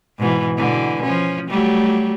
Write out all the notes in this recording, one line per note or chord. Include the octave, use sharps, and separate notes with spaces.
G#2 B2 E3
B2 D3 E3
F3 C#4
F#3 G3 A3